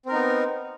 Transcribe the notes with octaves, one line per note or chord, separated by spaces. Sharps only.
B3 C4 D#4 A#4